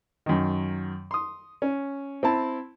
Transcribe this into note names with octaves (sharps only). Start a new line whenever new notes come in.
F#2 D#3
C6 D#6
C#4
C4 E4 A5